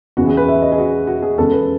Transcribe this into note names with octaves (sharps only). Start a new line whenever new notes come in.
E2 C#3 E3 F#4
G#4
B4
E5
D#5
G#4
F#4
F#4
G#4
E2 C#3 G#3 B3 A4
B4